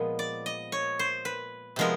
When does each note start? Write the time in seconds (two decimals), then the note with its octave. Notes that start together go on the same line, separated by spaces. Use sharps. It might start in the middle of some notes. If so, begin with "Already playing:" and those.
Already playing: A#2 F3 G#3 B3
0.19 D5
0.46 D#5
0.72 C#5
0.99 C5
1.25 B4
1.76 C3 F3 G#3 B3 A#4